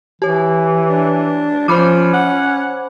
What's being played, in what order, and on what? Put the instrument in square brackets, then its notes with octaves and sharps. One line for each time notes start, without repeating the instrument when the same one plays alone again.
[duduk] E3 [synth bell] G4 C#5
[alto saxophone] D4
[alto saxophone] F3 [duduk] C#4 [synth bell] C5 B5 D6
[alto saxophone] F#5